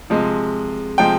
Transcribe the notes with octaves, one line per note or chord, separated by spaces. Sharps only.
C3 F3 G#3
C3 F3 G#3 G5